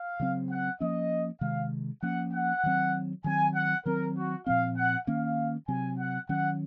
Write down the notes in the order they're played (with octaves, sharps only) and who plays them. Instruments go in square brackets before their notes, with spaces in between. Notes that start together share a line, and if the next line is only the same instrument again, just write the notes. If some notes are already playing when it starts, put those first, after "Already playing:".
Already playing: [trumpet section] F5
[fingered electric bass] C#3 F#3 C4
[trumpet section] F#5
[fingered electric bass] F3 A#3 C#4 [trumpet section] D#5
[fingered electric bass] C3 D#3 G#3 [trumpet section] F5
[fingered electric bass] F3 A#3 C#4 [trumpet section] F#5
[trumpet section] F#5
[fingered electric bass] D#3 F#3 C4
[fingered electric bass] D#3 F#3 C4 [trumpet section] G#5
[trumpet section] F#5
[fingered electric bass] D#3 F#3 C4 [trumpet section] A#4
[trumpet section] F#4
[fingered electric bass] A#2 F3 C4 [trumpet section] F5
[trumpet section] F#5
[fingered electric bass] D#3 A#3 C#4 [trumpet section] F5
[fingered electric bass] C3 F#3 C4 [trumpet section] G#5
[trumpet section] F#5
[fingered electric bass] D#3 F#3 C#4 [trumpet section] F#5